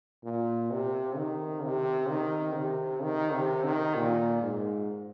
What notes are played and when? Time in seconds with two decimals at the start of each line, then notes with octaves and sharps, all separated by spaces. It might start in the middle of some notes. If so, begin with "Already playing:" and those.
0.24 A#2
0.71 C3
1.16 D#3
1.64 C3
2.09 D#3
2.56 C3
3.03 D#3
3.33 C3
3.64 D#3
3.95 A#2
4.41 G#2